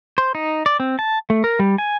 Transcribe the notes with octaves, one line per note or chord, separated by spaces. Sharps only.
C5
D#4
D5
C4
A5
A3
A#4
G3
G#5